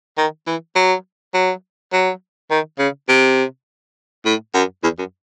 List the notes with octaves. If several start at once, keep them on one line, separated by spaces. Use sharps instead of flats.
D#3
E3
F#3
F#3
F#3
D#3
C#3
C3
A2
F#2
E2
F#2